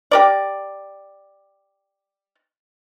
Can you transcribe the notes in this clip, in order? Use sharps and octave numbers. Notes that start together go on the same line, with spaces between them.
G4 A#4 D5